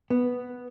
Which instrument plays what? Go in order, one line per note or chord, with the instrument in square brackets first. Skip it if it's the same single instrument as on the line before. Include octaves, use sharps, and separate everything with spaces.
[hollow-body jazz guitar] B3